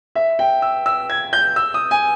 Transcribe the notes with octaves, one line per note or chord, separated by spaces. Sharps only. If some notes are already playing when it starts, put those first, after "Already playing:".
E5
G5
E6
E6
G#6
G6
E6
D#6
G#5